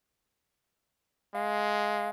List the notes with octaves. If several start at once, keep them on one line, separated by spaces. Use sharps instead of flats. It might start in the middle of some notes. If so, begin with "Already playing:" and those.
G#3 F5